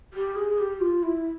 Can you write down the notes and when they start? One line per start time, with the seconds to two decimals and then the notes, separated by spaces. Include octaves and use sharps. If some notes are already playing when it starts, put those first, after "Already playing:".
0.13 G4
0.36 G#4
0.58 G4
0.81 F4
1.03 E4